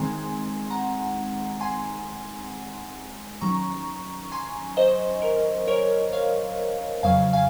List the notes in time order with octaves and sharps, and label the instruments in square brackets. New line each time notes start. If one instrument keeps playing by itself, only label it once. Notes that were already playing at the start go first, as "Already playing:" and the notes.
Already playing: [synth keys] D#3 G#3 C4 G#5 C6
F#5 A#5
G#5 C6
D#3 F#3 C#4 A#5 C#6
G#5 C6
C5 D#5
A#4
A#4 C#5
C#5 F5
F2 C#3 F#3 F5 G#5
F5 G#5